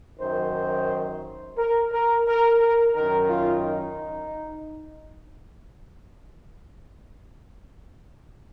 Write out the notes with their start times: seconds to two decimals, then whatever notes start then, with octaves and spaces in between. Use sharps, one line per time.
0.18 F#2 D#3 C5
1.56 A#4
1.91 A#4
2.26 A#4
2.59 A#4
2.93 F#2 D#3 A#4
3.29 F4
3.63 D#4